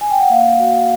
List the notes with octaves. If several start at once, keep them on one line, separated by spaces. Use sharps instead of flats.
G#5
G5
F#5
A#3 F5
F#4